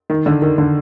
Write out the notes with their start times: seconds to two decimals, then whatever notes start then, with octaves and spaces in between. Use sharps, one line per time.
0.10 D#3
0.26 D3
0.42 D#3
0.58 D3